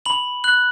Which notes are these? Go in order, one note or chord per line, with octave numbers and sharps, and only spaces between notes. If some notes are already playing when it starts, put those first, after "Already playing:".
B5 F#7
F#6 F#7